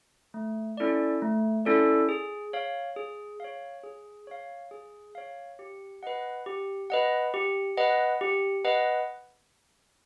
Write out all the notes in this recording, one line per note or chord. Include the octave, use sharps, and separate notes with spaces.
A3
C#4 E4 A4 D5
A3
C#4 E4 A4 D5
G#4
C#5 F5
G#4
C#5 F5
G#4
C#5 F5
G#4
C#5 F5
G4
B4 D#5 F#5
G4
B4 D#5 F#5
G4
B4 D#5 F#5
G4
B4 D#5 F#5